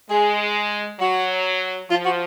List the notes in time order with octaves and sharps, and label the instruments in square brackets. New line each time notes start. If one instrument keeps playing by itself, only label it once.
[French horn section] G#3 [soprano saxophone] G#4
[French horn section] F#3 [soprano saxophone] F#4
[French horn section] F3 [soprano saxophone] F4
[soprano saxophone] F#4